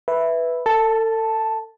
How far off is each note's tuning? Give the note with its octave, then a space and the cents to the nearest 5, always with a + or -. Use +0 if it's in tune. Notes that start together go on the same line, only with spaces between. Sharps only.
B4 +0 E5 +0
A4 +35 A5 +0